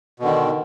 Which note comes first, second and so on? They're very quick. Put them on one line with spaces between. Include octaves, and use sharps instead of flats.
B2 D3 D#3